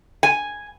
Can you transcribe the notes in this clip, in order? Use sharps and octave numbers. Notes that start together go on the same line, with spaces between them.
G#5